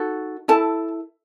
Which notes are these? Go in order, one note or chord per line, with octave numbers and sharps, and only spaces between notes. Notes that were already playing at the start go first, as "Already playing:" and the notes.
Already playing: D#4 F#4 A4
E4 A4 A5